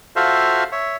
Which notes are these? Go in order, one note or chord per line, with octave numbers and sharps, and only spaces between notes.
F4 F#4 A4 C5 E5 F5
C#5 E5